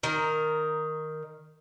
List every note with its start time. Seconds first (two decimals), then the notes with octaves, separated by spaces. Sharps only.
0.03 D#3 A#4